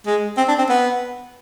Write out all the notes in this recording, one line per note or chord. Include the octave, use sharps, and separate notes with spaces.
G#3
C4
D4
C4
B3